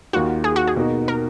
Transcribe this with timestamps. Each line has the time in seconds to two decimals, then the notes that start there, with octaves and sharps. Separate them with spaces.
0.13 D#2 D#3 A#3 F4 F#4
0.44 G#4
0.56 F#4
0.67 G#4
0.76 B2 A#3 D#4 F#4
1.08 A#4